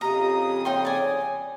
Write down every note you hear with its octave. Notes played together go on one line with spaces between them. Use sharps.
F2 C#3 G4 D#5 A#5 D#6
D#4 C#5 G5 C6
D5 G#5